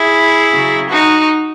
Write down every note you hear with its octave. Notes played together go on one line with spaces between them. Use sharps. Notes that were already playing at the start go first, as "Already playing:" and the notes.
Already playing: E4 G#4
C#3 F#3
D#4 F#4